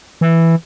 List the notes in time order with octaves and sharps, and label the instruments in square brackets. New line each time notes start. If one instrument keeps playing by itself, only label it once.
[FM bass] E3